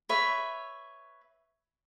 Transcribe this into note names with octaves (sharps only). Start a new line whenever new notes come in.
B4 C#5 E5